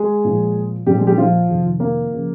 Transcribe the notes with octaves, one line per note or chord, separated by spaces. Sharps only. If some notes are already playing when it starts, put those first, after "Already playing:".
Already playing: G#3 G#4
A#2 F3
A#2 F3 G3 G4
G#3 G#4
G3 G4
F3 F4
F2 C3 D#3
A#3
C#3 F3